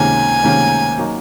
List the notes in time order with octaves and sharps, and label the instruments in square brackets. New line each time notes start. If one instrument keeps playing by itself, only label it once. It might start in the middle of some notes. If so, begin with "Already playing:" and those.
Already playing: [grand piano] C#2 C3 D#3 A#3 C#4 [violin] G#5
[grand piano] C#2 C3 D#3 A#3 C#4
F#3 A#3 D#4 F#4